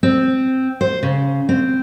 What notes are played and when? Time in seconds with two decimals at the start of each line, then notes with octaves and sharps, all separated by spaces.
0.03 C4
0.81 C5
1.03 C#3
1.49 C4